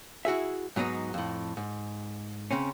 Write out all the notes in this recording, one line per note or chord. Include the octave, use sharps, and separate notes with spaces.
E4 F#4 G#4 E5
G#2 F#3 B3 C4 D#4
F2 A2
G#2
C#3 C4 C#4